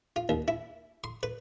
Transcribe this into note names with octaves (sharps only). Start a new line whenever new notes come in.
F4
D#2
E4
C6
B4